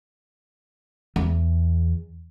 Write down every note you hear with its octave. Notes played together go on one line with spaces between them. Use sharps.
E2